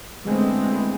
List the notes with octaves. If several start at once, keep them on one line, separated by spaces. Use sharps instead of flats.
D3 E3 G#3 A3 B3 C4